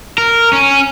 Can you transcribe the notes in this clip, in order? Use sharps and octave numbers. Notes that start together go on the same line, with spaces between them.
A#4
C#4